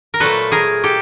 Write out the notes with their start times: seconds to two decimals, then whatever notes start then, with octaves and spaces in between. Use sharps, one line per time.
0.14 A#4
0.20 A#2 F#3 A3 A4 B4
0.51 G#4 A#4
0.84 G4 A4